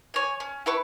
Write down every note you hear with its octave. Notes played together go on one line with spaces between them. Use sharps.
C#5 G#5
C#4
E4 B4 C#6